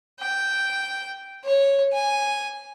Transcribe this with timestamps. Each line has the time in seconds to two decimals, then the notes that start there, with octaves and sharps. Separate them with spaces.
0.20 G5
1.45 C#5
1.93 G#5